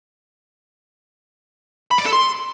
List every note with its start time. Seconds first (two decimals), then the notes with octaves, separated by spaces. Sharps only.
1.91 B5
1.98 D5
2.06 A4
2.13 C6